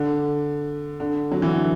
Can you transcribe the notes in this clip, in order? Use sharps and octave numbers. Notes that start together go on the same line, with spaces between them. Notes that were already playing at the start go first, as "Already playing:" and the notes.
Already playing: D3
D3
F#3
E3
D3